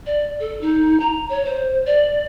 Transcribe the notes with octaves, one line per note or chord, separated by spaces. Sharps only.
D5
A4
D#4
A#5
C#5
C5
D5